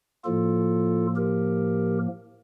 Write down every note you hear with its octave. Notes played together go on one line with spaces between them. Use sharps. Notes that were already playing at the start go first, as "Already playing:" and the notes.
A2 F3 A#3 F4 A4
G4 A#4